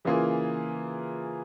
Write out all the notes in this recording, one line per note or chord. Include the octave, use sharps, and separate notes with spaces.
C#3 E3 A#3 F4 G#4